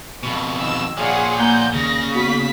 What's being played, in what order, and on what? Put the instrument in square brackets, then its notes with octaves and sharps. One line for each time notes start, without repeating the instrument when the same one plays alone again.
[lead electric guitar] F2 B2
[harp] D#3 [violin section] E6
[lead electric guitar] A#2 F3 [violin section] G#4 F#5 [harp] C#5 D5 F5
[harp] A#3 [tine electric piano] F#5 G#5 A#5 [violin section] G6
[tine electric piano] D#2 [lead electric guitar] C#3 [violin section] A#6
[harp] B3 [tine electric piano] F#4 [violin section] B6